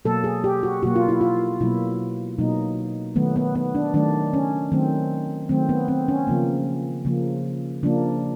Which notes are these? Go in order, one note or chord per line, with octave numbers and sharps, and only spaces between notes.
B2 F#3 A#3 A4
G#4
G4
F#4
B2 F#3 A#3 F#4
F4
E4
F4
B2 F#3 A#3 E4
B2 F#3 A#3 D#4
D#3 F#3 A3 B3
B3
B3
D4
D#3 F#3 A3 D4
C#4
D#3 F#3 A3 C4
D#3 F#3 A3 C4
B3
C4
C#4
C#3 F3 A#3
C#3 F3 A#3
C#3 F3 A#3 D4